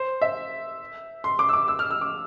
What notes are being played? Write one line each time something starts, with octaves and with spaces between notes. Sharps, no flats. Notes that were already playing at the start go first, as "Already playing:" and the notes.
Already playing: C5
E5
C6
D6
E6
D6
E6
F6
E6
D6